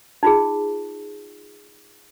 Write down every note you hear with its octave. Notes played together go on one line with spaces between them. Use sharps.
D#4 F4 G#4